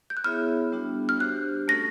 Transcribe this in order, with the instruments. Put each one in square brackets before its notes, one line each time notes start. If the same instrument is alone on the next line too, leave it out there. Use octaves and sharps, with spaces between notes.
[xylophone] G6
F#6
[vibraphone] B3 E4 G#4 C#5 E5 [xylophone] F6
[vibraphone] G3 B3 D4 F#4
[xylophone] F6
[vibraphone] D4 G4 C5 [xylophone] F#6
[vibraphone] A3 C#4 F#4 A4 [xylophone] A#6